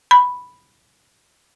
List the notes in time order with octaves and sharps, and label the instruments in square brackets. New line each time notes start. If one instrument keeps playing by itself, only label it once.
[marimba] B5